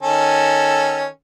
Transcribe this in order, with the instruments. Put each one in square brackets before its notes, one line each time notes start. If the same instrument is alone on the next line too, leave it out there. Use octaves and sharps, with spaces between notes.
[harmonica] D#3 C#4 A4